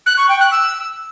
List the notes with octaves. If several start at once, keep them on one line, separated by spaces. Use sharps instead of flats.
F#6
C#6
G5
F#6
E6